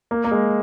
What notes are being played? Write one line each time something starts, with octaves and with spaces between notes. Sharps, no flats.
A#3
A#3
G#3